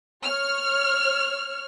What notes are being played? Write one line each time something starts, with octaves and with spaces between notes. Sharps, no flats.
C#5 F6